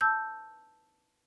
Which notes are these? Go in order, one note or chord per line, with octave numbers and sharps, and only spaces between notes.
A5 E6 G6